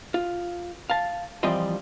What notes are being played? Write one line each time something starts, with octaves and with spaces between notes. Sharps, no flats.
F4
F5 A5
E3 F3 G3 C4 F4 D#5